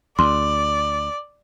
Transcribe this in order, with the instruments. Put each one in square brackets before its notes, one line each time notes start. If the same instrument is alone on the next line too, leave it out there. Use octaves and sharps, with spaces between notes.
[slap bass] D2 [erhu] D5 [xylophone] C6